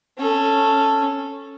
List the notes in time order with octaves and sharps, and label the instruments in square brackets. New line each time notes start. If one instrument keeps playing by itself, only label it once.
[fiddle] C#4 A4